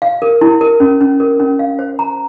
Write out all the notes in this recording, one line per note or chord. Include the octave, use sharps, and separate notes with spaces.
F5
A#4
E4
A#4
C#4
C#4
A#4
C#4
F5
C5
A#5